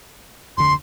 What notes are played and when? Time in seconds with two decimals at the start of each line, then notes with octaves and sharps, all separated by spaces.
0.57 F1 D2 D3 C6